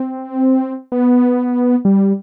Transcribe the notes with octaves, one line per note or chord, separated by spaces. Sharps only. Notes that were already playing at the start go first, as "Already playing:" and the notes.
Already playing: C4
B3
G3